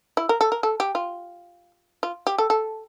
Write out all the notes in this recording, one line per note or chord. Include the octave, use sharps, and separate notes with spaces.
E4
A#4
A4
A#4
A4
G4
F4
F4
G4
A4
A4